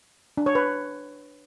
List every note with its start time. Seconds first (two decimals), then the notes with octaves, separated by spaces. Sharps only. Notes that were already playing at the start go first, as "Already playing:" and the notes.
0.37 D4
0.46 C#5
0.55 B4